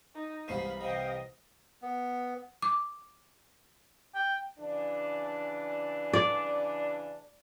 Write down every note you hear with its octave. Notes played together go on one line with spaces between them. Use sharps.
D#4
C2 E3 G#3 C5 F5 B5 C7 D#7
C3 E3 D#5 F5 G5
B3
D6
G5
C#3 E3 D4
D5